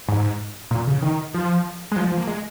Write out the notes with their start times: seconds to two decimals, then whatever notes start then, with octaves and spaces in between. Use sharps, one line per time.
0.08 G#2
0.71 A#2
0.87 C#3
1.02 D#3
1.34 F3
1.92 G#3
1.96 F3
2.07 F3
2.18 A#3
2.27 G#3